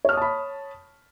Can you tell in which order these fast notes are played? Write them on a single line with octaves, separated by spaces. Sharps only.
C#5 F6 D#6 A5 B5